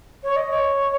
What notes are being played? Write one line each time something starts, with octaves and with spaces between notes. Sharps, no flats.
C#5
D#5
C#5